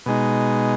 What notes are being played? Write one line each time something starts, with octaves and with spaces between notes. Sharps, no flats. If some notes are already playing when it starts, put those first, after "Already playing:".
B2 G#3 D#4